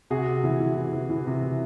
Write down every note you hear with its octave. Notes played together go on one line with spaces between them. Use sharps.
C3 F#4 G#4
C3
E3
E3
E3
E3
E3
C3
E3